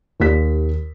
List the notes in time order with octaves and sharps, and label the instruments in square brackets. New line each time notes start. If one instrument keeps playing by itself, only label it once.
[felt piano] D#2 G4 B6